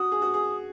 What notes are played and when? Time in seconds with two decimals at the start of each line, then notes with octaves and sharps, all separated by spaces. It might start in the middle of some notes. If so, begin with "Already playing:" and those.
Already playing: F#4 D#6
0.12 G#4
0.22 F#4
0.34 G#4